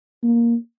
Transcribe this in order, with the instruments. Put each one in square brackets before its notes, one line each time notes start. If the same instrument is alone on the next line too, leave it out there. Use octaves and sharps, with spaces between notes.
[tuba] A#3